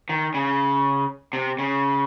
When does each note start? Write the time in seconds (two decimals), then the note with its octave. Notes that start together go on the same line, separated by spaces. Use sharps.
0.09 D#3
0.34 C#3
1.33 C3
1.59 C#3